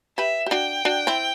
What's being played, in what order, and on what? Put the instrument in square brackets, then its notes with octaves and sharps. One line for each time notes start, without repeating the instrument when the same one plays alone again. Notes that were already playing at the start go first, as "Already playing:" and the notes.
[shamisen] G4 B4 [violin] E5
[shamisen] G4
[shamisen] D4 F#4 [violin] G5
[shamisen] D4 F#4
C4 E4